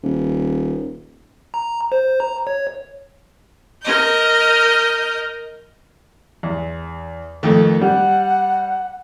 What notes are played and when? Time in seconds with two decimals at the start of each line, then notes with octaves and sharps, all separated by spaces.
0.03 D#1
1.54 A#5
1.92 C5
2.20 A#5
2.47 C#5
3.82 A#4 D#5 G6
6.43 E2
7.43 F2 D#3 A3
7.81 G3 F#5